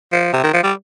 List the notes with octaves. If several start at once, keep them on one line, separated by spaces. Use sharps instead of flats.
F3
C3
D#3
F3
G3